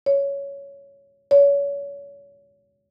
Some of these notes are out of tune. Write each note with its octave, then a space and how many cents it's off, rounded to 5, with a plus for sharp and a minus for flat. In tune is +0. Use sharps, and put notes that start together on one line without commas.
C#5 +10
C#5 +30